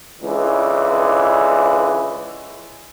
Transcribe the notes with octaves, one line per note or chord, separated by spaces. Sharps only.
C#2 D3 E3